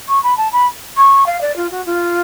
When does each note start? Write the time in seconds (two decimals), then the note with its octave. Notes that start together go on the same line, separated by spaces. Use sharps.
0.08 C#6
0.23 B5
0.37 A5
0.52 B5
0.96 C#6
1.26 F5
1.41 D5
1.56 F4
1.70 F#4
1.85 F4